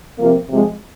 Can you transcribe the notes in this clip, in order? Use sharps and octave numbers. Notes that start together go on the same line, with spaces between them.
C3 F3 A#3
C3 F3 G#3